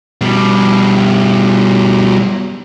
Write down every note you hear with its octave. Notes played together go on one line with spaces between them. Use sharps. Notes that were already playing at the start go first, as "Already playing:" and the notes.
B2 G3